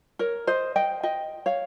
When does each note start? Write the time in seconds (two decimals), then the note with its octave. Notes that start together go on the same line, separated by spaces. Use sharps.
0.19 A#4 C#5
0.47 C5 D#5
0.76 D#5 G5
1.03 D#5 G5
1.46 C#5 F5